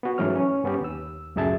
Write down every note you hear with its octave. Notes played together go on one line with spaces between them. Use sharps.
B3 F#4
G#2 E3 F#3 A3 C#4 F6
C#4
G2 B3 C#4 G4
D#2 E6
C#2 F#2 A2 G#4 E5 A5